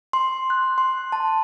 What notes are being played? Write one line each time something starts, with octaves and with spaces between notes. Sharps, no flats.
C6
F#6
C6
A5